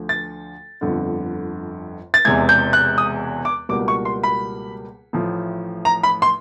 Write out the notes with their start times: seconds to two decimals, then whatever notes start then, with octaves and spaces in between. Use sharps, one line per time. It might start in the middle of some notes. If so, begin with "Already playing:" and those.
Already playing: D2 D3 F3
0.09 A6
0.81 G1 F2 D3
2.14 A6
2.25 E1 E2 C3 E3 G#3 G#6
2.49 G6
2.73 F#6
2.98 D#6
3.45 D6
3.69 C#2 B2 G3 A#3 D6
3.88 C#6
4.05 C6
4.23 B5
5.13 A1 A2 F3
5.85 A#5
6.03 B5
6.22 C6